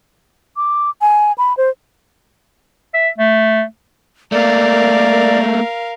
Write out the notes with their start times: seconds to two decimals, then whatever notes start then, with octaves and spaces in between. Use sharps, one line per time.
0.57 D6
1.01 G#5
1.38 B5
1.57 C5
2.94 E5
3.18 A3
4.32 A3 A#3 A#4 D5 F5